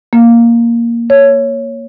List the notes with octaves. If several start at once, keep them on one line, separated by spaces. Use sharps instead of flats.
A#3
C#5